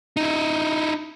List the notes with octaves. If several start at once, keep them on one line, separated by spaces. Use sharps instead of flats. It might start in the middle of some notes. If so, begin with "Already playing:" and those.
D#4 E4